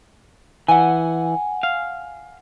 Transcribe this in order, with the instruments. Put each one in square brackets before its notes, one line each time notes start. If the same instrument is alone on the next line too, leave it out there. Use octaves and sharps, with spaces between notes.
[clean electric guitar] E3 [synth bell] F#5 G#5
[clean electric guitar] F5